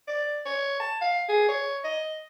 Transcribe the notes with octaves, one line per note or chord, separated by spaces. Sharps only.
D5
C#5
A5
F5
G#4
C#5
D#5